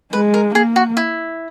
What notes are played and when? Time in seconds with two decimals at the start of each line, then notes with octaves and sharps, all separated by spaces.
0.13 G#3 B4
0.34 A#4
0.55 A#3 G#4
0.76 F#4
0.97 E4